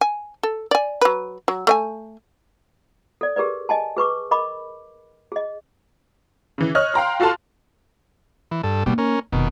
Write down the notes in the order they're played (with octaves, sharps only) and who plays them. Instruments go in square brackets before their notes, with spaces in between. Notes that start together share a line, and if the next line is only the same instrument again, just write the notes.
[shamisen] G#5
A4
D5 G#5
F#3 B4
F#3
A3 D#5 G#5
[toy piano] A4 D5
G4 G#4 A#4 B4 D5
D#5 G#5 A5
G#4 B4 C#6 D6
A#4 D#5 B5 D6
G#4 D#5
[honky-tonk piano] C#3 E3
C#5 D#5 F6 F#6
F5 G5 A#5 C6
F4 F#4 A4 F5 A5 C6
[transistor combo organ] E3
G2 A4
[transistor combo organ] B2 G3 [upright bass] A#3 D#4
[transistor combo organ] C#4 A#4
[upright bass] F1 [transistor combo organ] B2 D#3